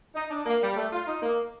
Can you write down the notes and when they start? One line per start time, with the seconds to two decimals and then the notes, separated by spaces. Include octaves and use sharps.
0.15 D#4
0.30 D4
0.46 A#3
0.62 G3
0.76 A3
0.92 F4
1.06 D#4
1.22 A#3